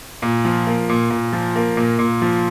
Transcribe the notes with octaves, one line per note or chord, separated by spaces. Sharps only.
A#2
F3
A#3
A#2
A#2
F3
A#3
A#2
A#2
F3